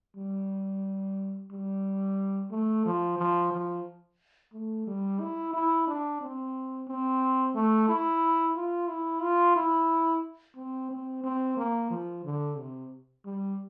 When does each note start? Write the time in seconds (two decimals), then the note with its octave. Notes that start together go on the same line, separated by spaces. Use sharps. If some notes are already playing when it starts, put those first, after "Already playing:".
0.16 G3
1.51 G3
2.51 A3
2.85 F3
3.18 F3
3.52 F3
4.53 A3
4.87 G3
5.20 E4
5.53 E4
5.87 D4
6.21 C4
6.88 C4
7.55 A3
7.88 E4
8.56 F4
8.88 E4
9.22 F4
9.56 E4
10.56 C4
10.91 C4
11.24 C4
11.57 A#3
11.90 F3
12.25 D3
12.57 C3
13.25 G3